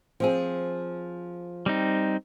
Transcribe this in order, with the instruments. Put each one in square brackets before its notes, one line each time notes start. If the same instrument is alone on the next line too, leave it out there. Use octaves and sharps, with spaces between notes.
[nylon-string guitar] F3 C4 G#4
[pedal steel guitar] G3 C4 D#4